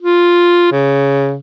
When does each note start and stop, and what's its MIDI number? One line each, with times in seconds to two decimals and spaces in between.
0.01 0.69 65
0.72 1.37 49